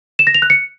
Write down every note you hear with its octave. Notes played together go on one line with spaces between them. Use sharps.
E7
A#6
F7
F#6
C#7